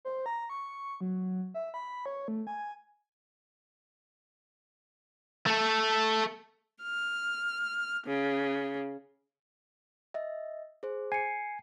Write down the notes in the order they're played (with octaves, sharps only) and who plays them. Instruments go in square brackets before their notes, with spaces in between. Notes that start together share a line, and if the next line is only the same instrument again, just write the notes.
[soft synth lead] C5
A#5
C#6
F#3
E5
B5
C#5
A3
G#5
[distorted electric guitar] A3 A4
[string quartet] F6
C#3
[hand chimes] D#5 E5
G#4 C5
[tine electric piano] G#5 [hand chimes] C7 C#7